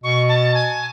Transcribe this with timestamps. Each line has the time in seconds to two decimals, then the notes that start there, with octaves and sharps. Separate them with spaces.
0.04 B2 C#6
0.29 A5
0.54 G#5